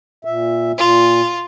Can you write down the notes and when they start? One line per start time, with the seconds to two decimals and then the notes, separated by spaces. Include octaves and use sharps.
0.25 A#2 E5
0.77 A#2 F4